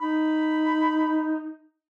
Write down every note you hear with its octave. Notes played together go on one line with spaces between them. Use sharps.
D#4 B5